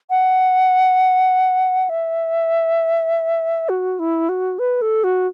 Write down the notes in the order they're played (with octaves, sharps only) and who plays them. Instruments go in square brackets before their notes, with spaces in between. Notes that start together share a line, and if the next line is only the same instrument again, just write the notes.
[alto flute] F#5
E5
F#4
E4
F#4
B4
A4
F#4